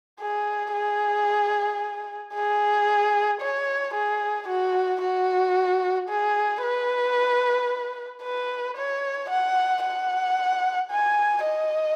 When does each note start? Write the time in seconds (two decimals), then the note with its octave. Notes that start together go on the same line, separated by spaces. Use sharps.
0.20 G#4
0.73 G#4
2.35 G#4
3.41 C#5
3.94 G#4
4.48 F#4
5.01 F#4
6.09 G#4
6.63 B4
8.23 B4
8.77 C#5
9.30 F#5
9.84 F#5
10.91 G#5
11.45 D#5